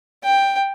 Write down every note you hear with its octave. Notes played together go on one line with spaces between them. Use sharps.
G5